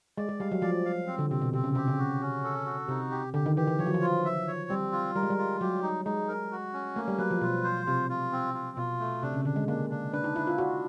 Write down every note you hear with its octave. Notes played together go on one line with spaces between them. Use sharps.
G#3 D5
G#3
G3 F5
F#3
F3 D5
F5
C4
D3
C3 C4
B2
C3 C4
C#3
C3 G4
C#3
F#4
C#4
A4
F#4
C3 D#4
G4
D3 G4
D#3
E3 G4
E3
F3 C#5
F#3
F3
F4
E5
C#5
G3 C4
F4
G3 A#4
G#3
G3
F4
F#3 G4
D#4
G#3 D#4
A#4
F#4
C#4
A3 A#3
G3
F#3 B4
F3
B2 F4
C5
C3 F4
F4
C4
F4
B2 F4
A3
C3 D4
C#3
D3 D4
G#3
A#3 D4
D4
D4 B4
D#4
D4 E4
F4
D4 F#4